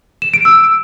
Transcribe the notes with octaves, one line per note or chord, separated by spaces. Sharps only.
E7
D7
E6